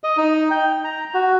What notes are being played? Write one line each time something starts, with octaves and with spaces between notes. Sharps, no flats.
D#5
D#4
G5
A#5
F#4